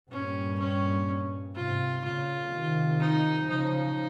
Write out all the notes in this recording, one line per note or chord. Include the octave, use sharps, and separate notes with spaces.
G2 A#2 C#4
C#4
G#2 C3 F4
A#2 C#3 F4
C3 D#3
D#4
C#3 F3 D#4